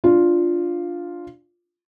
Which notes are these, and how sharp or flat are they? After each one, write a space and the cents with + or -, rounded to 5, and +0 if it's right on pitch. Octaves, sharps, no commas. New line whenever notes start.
D4 +0 F4 +0